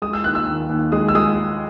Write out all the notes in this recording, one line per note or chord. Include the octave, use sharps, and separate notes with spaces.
G#3 D#6
E6
D#2 F#6
E6
D#3
D#2
G#3 D#6
E6
G#3 D#6